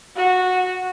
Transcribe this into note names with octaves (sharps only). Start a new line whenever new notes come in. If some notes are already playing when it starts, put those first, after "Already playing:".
F#4